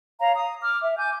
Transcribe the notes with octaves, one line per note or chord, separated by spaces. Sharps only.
C#5 F5 A#5
D#6
D6 F6
E5
G#5 D6 G6